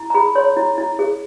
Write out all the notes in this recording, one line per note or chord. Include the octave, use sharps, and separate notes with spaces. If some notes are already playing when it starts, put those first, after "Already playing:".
Already playing: E4
A#5
G#4 B5
C#5 C6
E4
E4
G#4